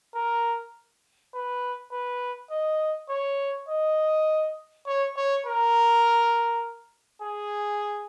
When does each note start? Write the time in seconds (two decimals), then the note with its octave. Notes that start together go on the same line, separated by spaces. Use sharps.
0.15 A#4
1.34 B4
1.92 B4
2.51 D#5
3.10 C#5
3.68 D#5
4.87 C#5
5.16 C#5
5.46 A#4
7.22 G#4